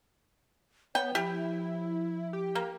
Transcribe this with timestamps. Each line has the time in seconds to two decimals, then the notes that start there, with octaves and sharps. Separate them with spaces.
0.95 B3 C#5 G5
1.15 F3 E4 G4
2.33 G4
2.55 A#3